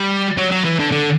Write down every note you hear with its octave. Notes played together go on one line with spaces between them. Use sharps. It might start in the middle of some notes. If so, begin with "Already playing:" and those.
Already playing: G3
F#3
F#3
E3
D3
D3